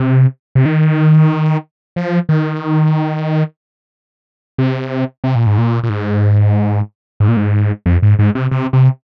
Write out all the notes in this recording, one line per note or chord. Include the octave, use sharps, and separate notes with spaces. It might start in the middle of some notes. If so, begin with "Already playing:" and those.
Already playing: C3
C3
D#3
F3
D#3
C3
C3
A#2
G#2
A#2
A#2
G#2
G#2
A#2
G#2
F2
G#2
G#2
C3
C3
C3